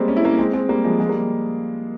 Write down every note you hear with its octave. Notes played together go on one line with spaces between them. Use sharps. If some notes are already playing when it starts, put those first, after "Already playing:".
Already playing: G3 G#3 A#3 C4
C#4
E4
A#3 C#4
G#3 C4
G#3 C4
G3 A#3
F3 G#3
F3 G#3
G3 A#3